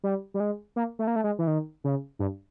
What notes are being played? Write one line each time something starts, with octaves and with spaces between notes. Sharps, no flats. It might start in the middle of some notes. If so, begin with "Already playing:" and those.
G3
G3
G#3
A#3
A3
A#3
A3
G#3
E3
D#3
C#3
G2